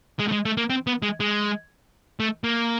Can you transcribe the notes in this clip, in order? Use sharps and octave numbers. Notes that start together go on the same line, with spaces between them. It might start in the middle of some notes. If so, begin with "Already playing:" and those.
G#3
A3
G#3
A3
A#3
C4
B3
G#3
G#3
A3
A#3